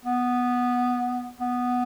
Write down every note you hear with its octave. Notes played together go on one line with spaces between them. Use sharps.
B3
B3